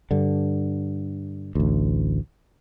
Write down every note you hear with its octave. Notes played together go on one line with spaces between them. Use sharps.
G2 D3
A1 D2